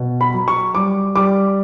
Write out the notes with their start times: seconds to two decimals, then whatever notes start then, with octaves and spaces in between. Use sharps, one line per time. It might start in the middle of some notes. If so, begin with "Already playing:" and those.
Already playing: B2
0.21 B5
0.34 F#3
0.48 C#6
0.75 G3 D6
1.15 G3 D6